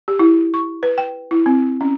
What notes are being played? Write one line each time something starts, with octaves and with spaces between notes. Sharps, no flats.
G4
E4
C#6
B4
G5
E4
C4
C#4